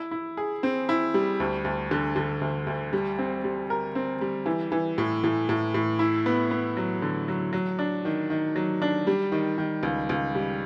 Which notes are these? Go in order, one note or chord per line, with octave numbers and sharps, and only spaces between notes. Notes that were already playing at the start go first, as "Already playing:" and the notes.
Already playing: E4
E4
G#4
C4
E4
G3
D2
D2
D3
D3
D2
D2
G3
C4
G3
A#4
C4
G3
E3
E3
A2
A2
A2
A2
E4
B3
B3
F#3
D3
F#3
F#3
D4
D#3
D#3
F#3
D4
G3
D#3
D#3
C#2
C#2
G3